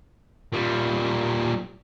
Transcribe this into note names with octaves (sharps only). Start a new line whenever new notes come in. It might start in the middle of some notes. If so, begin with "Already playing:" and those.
A#2 G3